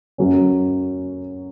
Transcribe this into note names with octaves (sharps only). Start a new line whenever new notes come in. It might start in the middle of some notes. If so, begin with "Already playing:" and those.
F#2 F#3 C#4